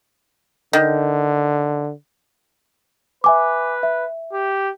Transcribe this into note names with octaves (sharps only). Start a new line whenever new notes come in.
D3 D#3
B4 E5 G#5 D6
E5
G4